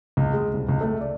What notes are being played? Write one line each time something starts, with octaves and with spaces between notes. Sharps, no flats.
C#2
G#3
C2
C#2
A3
D5